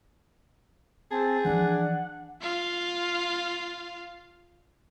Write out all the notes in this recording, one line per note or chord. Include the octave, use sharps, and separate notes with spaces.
C4 G#4 A5
E3 F3 D4 F#5
F4 F5